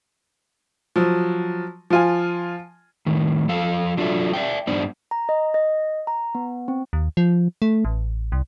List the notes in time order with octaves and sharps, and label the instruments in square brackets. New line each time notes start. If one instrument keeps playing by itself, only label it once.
[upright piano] F3 F#3
F3 F4 G#5
[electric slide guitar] A2 D#3
F3 A4 F5
F#3 D4 F4 G4 A4 E5
D5 E5 G5
G2 B3 D4 C5 D5
[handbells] A#5
D#5
D#5
A#5
B3
C4
[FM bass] D#2
F3
A3
A1
C2